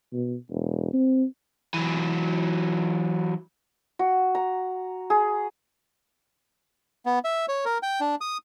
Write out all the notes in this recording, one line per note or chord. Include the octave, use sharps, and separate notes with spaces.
B2
E1
C4
E3 F#3
F#4
A#5
G#4
B3
E5
C#5
A#4
G5
D4
D#6